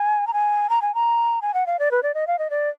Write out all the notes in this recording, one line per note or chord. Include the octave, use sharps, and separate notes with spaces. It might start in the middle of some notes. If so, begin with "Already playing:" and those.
Already playing: G#5
A#5
G#5
A#5
G#5
A#5
G#5
F#5
F5
D5
B4
D5
D#5
F5
D#5
D5